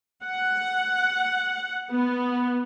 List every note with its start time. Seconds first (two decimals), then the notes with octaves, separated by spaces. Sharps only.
0.24 F#5
1.91 B3